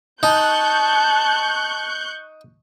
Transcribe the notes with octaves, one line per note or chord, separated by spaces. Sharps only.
D#4 A5 C#6 F#6 G6